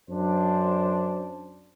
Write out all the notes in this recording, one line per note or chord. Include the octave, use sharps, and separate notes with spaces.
F#2 D4 C5